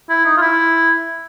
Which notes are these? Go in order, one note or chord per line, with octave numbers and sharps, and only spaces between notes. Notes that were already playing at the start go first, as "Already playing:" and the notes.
E4
D#4
F4
E4